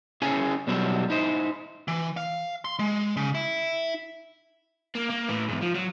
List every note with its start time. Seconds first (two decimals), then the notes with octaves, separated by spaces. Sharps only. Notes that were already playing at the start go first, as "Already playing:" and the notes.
0.22 C#4 E4 G#4 C#5 G#5
0.67 B2 F#3 G3 E4
1.10 D#4 E4 C5
1.88 E3
2.17 F5
2.65 C6
2.79 G#3
3.17 C#3
3.35 E4
4.95 A#3
5.09 A#3
5.28 A2 E3
5.48 E2 G#2
5.62 F3
5.75 F#3